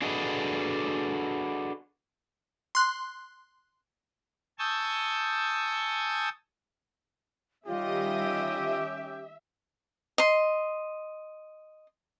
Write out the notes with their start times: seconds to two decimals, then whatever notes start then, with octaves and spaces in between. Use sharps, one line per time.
0.02 D4 F#4 G#4 A4 B4 D#5
2.75 C6 F#6
4.59 G#5 A5 C#6 D#6 E6 G6
7.67 D#3 G3 C#4 F4 G4 D#5 E5
10.18 D#5 C6